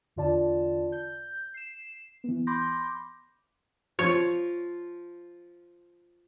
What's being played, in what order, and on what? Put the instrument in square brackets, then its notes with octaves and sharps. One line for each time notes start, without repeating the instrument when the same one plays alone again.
[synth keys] E2 D3 F4 D5 A5
G6
C7 E7
E3 B3
B5 C6 D6 G6 A#6
[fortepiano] F3 [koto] C#5